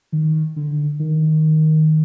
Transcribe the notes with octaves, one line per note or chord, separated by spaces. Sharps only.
D#3
D3
D#3